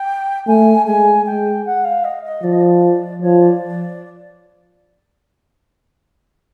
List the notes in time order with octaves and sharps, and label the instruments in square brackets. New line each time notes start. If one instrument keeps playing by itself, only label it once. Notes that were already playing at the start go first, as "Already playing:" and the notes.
Already playing: [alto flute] G5
[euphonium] A3 [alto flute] G#5
[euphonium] G#3 [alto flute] G#5
[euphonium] G#3 [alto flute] G5
[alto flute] F#5
F5
D#5
D#5
[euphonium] F3 [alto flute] D5
[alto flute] D#5
D5
[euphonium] F3 [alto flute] C#5
[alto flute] D5